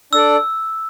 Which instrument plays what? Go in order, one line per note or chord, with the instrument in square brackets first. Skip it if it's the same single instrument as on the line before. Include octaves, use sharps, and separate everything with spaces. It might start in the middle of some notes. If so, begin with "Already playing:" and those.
[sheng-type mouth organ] D4 A4 D5 [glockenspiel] E6